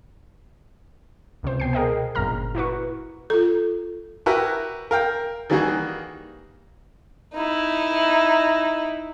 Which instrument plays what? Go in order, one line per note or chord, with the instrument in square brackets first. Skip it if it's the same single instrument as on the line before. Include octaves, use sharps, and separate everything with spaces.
[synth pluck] C#2 C3 C5
B2 G5 C7
G#4 A#4 D#5 G5
G1 F#2 A#2 A#5 F6
E4 F#4 B4 C#6
[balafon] F4 A4
[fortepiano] E4 F#4 G4 A#4 B4 F#5
A#4 F5 G5
D#3 E3 G3 A#3 F#4 G#4
[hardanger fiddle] D#4 E4